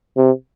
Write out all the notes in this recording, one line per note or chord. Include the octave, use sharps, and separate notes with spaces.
C3